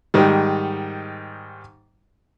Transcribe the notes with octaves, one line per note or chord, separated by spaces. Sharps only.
G#2 D#3 G3